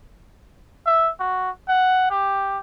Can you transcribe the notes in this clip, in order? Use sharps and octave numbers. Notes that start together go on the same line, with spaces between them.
E5
F#4
F#5
G4